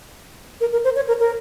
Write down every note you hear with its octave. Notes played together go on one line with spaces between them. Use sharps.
A#4
A#4
C5
C#5
A#4
A#4